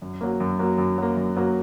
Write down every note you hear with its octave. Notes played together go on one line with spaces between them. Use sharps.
F#2
F#3 A#3
F#2
F#3 A#3
F#2
F#3 A#3
F#2
F#3 A#3